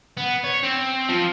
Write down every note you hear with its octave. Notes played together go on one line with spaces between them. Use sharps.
B3
C#5
C4
F3